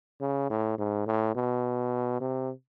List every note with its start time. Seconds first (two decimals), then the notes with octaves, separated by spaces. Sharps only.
0.21 C#3
0.50 A2
0.78 G#2
1.06 A2
1.35 B2
2.21 C3